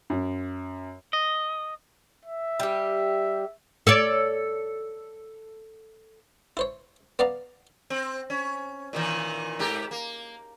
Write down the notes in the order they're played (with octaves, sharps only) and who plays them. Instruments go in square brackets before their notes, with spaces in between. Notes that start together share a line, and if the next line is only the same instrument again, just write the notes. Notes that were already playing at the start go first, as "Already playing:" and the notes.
[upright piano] F#2
[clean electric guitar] D#5
[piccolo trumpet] E5
[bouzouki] G3 G4
[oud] A4 C#5 D5
[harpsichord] E4 C5 C#5
B3 D5 F5 A#5
[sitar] C4
C#4
A#2 D#3 E3
G#2 G4 A#4
A#3